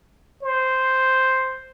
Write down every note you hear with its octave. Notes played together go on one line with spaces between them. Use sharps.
C5